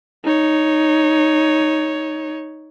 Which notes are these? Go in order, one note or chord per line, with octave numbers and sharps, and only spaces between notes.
D#4 C#5